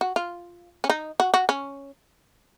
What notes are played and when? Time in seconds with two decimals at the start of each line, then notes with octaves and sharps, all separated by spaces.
0.01 F#4
0.16 F4
0.84 C#4
0.90 D#4
1.20 F#4
1.34 F#4
1.49 C#4